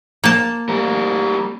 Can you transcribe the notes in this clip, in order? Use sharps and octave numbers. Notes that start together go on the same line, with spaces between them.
A#3 A5
G3 A#4